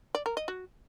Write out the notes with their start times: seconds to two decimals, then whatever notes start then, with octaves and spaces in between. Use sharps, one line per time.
0.15 D5
0.26 A#4
0.37 D#5
0.48 F#4